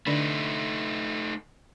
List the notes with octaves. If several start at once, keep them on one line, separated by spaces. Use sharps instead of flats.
D3 A3 D4 D#4 D5